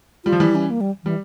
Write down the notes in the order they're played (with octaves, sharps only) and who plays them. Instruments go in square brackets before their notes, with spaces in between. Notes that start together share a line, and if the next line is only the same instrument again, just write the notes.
[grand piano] G3 [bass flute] F4
[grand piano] F3
[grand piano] E3 G3 [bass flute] E4
[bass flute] C#4
A#3
G3
[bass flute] E3 [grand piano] G3